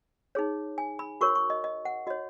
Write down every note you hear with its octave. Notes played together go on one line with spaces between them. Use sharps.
D#4 G#4 C#5
G#5
B5
F#4 A#4 C#5 C#6
C#6
D#5
D#5
F#5
F#4 C#5 D#5